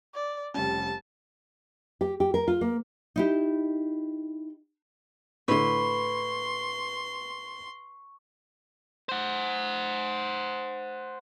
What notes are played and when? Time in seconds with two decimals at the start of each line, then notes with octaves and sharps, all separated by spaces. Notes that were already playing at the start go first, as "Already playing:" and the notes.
0.14 D5
0.54 F1 G3 C#4 A5
2.01 G4
2.20 G4
2.34 A#4
2.48 F4
2.61 A#3
3.16 D#4 E4 G4
5.48 A2 D3 B4 C6 C#6
9.09 C5 F#5